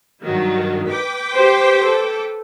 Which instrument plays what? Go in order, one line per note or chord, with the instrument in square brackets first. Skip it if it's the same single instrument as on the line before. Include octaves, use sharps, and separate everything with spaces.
[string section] G2 D#3 F#3
B4 G5 D6
[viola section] G4 C5
A4